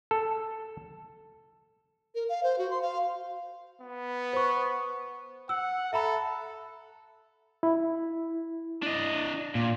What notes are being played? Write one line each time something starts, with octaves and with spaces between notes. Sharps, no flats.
A4
A#4
F5
C5
F#4
C6
F5
B3
C5 C#6
F#5 E6
A4 E5 A#5 B5
E4
D4 D#5
A#2